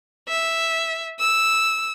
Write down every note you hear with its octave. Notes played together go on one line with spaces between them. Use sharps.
E5
E6